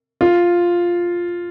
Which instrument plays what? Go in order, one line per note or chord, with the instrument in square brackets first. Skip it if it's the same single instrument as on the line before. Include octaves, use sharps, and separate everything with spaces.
[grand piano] F4